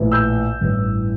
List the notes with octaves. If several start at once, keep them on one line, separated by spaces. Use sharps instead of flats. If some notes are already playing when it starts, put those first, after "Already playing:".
Already playing: A#1 A2 E3
E6 G6
A1 G2 E3